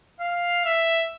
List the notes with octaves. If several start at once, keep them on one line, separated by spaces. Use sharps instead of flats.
F5
E5